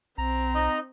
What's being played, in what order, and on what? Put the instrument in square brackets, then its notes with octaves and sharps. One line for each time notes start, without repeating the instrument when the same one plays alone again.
[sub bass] B1 [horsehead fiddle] C4 [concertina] A#5
[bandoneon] D#4 D#5